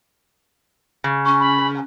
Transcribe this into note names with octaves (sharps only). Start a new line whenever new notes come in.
C#3
C#4 C#6
B5